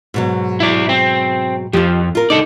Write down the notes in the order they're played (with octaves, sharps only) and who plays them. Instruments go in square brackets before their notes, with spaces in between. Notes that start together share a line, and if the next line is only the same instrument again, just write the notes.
[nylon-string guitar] G#2 B2 F#3
[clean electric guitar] E4 D5
C4
[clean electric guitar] F2 F3 [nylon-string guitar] F4 G4
[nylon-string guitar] F4 A#4
[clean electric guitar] C#2 A4 D5 [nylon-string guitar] D#4